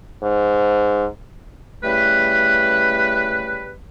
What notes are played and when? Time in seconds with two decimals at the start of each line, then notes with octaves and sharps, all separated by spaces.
0.23 G#2
1.83 C#3 G3 A3 E4 B4